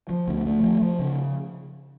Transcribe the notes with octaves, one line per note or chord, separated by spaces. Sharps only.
F3
D2
A3
F3
F3
C#3